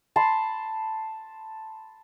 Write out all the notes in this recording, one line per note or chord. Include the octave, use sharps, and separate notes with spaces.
A5 B5 C6